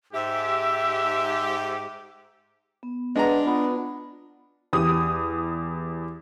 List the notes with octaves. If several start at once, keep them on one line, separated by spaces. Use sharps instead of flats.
G#2 G4 E5
B3
G#3 D4 B4 F#5 A#5
B3 F4
E2 G4 D#6